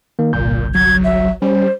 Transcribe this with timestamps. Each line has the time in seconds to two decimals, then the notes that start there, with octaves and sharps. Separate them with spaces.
0.19 D#3 A#3
0.33 G1 C2 A#2 G6
0.75 F#3 G#6
1.04 E5
1.42 G3 C#4 C5